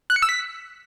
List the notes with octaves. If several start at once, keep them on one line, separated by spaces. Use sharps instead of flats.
F#6
C#7
E6
B6